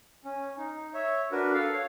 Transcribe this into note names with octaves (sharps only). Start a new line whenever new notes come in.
C#4
D#4
C#5 E5
D4 F#4 A#4 B4
A4 F5
C#5 F5